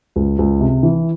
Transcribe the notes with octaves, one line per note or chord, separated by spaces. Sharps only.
C#2
C#2
C3
E3